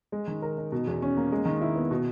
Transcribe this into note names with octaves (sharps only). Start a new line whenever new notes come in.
G#3
D#3
A#4
D#4
B2
E2
C#4
A#3
G#3
D#3
E4
B3
B2